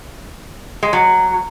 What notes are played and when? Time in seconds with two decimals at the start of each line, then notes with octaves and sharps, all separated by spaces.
0.83 G#3
0.93 F#3